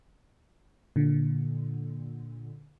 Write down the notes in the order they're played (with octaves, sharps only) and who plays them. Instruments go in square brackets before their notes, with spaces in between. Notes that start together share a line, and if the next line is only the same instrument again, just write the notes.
[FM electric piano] A#2 D3